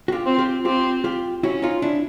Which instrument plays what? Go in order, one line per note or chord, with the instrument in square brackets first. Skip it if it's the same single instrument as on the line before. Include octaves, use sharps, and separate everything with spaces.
[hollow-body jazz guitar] F#4
F4 G4
[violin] C4
[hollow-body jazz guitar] F4 G4
[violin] C4 [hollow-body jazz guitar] F4 G4
[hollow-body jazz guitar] F4 G4
[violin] C#4 [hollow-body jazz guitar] E4 F#4
[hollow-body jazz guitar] D#4 F4
D4 E4